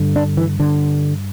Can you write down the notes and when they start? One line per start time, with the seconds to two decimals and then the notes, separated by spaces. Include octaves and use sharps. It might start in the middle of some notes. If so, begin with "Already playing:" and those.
Already playing: G2 D3
0.16 D4
0.37 E3
0.60 D3